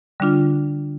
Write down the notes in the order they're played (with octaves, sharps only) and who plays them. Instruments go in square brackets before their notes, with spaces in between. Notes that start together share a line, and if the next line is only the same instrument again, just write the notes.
[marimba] D3 G3 D4 F4